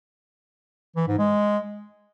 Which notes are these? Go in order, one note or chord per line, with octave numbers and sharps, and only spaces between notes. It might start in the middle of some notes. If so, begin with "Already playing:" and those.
E3
G#2
G#3